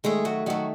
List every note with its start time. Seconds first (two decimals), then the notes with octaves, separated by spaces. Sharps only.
0.04 D#3 G#3 A3 G#4
0.25 F#3 F#4
0.46 D#3 F#3 A3 F#4